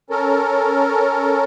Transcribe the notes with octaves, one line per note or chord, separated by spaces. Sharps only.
C#4 A4 A#4